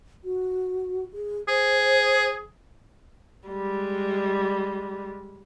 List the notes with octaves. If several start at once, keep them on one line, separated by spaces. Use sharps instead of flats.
F#4
G#4
G#4 C5
G3 G#3